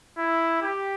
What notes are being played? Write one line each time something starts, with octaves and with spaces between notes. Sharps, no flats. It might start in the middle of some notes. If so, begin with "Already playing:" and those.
E4
G4